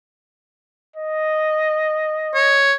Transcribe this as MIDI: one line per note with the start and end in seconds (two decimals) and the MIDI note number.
0.96 2.66 75
2.35 2.74 73